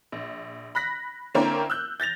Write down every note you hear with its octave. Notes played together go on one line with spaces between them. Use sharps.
A#1
B5 F#6 A#6 B6
D3 A#3 C4 C#4 E4 A#4
E6 F#6 G6
G6 A6 A#6 F7